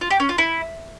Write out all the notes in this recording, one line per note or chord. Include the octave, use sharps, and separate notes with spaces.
F4
G4
C#4
F4
E4